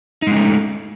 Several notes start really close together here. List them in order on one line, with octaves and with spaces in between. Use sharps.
D#4 G#3 C#4 A3